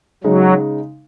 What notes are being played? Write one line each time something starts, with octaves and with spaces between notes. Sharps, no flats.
C#3 F#3 G#3 D#4